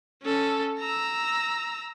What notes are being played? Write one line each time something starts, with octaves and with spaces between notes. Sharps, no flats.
C#4 A4
A#5 E6